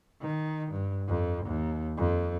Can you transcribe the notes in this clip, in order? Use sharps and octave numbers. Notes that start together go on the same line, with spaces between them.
D#3
G2
F2
D#2
F2